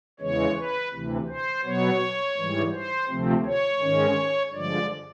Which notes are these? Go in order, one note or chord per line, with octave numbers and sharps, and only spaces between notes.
E2 C#3 E3 G#3 C#5
B4
D2 C3 E3
C5
B2 F#3 B3 C#5
G#2 E3 G3
C5
D2 C3 F3 A3 C4
C#5
G#2 D#3 G#3 C#4
G2 D3 F3 G#3 D5